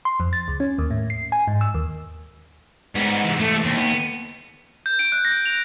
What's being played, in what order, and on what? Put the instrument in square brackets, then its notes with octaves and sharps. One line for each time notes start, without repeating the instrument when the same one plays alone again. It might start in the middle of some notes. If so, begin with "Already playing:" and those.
[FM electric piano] C6
F2
A6
C#2
C#4
D#2
A2
C7
G#5
G#2
E6
D#2
[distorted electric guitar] G#2 [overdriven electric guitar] G3 B3
[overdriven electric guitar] C3 E3
[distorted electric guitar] A3
D#2
[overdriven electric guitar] B3
[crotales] G6
D7
F#6
A#6
F7